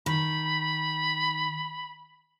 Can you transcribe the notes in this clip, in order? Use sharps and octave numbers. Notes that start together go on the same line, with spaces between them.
D#3 B5